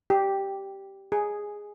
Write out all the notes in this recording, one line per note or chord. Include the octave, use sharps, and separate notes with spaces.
G4
G#4